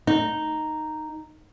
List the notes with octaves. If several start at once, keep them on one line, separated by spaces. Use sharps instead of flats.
D#4